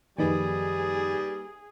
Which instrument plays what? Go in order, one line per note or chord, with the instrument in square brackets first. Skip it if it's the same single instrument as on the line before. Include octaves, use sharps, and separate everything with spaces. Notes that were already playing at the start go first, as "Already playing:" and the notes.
[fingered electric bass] F#2 D#3 F3 [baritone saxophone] G3 [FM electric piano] A#3 D#4 B4 [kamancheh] G#4